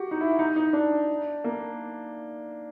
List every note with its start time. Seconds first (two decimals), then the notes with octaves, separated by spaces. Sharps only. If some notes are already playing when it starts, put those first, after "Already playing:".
Already playing: F#4 G4
0.11 D#4
0.21 E4
0.39 D#4
0.56 D#4
0.73 D4
1.44 A#3